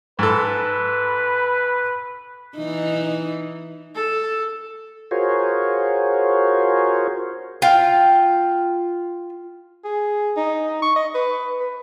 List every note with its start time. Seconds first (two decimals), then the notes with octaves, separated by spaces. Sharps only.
0.19 G#2 A4 B4
2.57 E3 D#4
3.95 A4
5.11 F4 F#4 G#4 A#4 C5 C#5
7.62 F4 G5
9.84 G#4
10.36 D#4
10.82 C#6
10.96 D#5
11.15 B4
11.60 B4